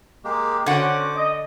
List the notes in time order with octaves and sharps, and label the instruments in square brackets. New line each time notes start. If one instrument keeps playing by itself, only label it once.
[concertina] G#3 A#3 G4
[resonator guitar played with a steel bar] D3 F#5 [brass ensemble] C#4 F#4 [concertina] C5 D6
[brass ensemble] D#5